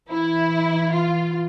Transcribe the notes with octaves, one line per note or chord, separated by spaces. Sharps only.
E3 E4
F4